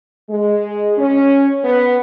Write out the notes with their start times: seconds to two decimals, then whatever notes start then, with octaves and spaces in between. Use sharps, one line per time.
0.30 G#3
0.97 C#4
1.64 B3